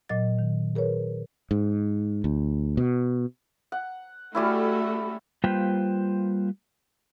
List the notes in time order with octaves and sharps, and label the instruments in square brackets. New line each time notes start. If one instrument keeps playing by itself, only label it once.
[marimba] A#2 F#3 D#5 A6
D#3
G#4 A#4 B4 C#5
[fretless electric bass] G#2
D2
B2
[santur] F#5
[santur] G3 C#4 E4 [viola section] A3 F#4 A4
[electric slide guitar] G3 A#3 F4 B4 C5 G5